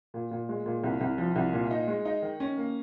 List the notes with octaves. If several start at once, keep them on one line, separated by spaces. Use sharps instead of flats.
A#2
A#2
G#3
A#2
C2
C2
F3
C2
A#2
D#4
G#3
D#4
D#3
C#4
A#3